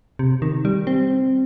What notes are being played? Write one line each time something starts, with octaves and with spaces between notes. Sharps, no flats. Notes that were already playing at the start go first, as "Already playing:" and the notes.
C3
D#3
G3
C4